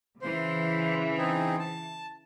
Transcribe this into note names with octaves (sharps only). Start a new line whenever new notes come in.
C#3 E3 C5
C4 D#4 G#4
A5